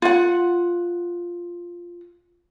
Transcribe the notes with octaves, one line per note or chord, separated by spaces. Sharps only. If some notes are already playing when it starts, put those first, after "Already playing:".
F4 F#5